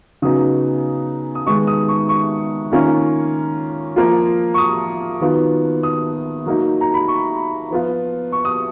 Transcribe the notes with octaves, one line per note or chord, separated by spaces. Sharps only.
C#3 F#3 B3 D#4 D#6
D#6
D#3 G#3 B3 D#4 C#6
D#6
C#6
C#6
D#3 A#3 C#4 F4
F3 A#3 F4
C#6
D#6
D#3 F#3 B3 F4
D#6
F#3 A#3 D#4
A#5
B5
C#6
F3 B3 F4
C#6
D#6